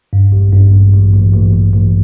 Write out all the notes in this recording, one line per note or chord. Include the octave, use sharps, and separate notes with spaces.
G2
A1
G2
A1
A1
A1
A1
A1
A1